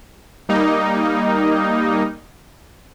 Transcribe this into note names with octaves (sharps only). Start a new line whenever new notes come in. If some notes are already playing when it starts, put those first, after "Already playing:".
G3 A#3 D#4